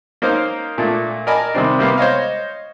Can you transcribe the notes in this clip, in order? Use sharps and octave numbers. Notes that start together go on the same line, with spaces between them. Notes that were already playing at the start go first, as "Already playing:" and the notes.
A#3 C#4 D#4 C5 F5 A#5
A#2 A3 D4
A#4 D5 D#5 G#5 A5 B5
C3 D#3 G3 C4 D4
C3 G3 A#3 B3
C5 C#5 D#5 F5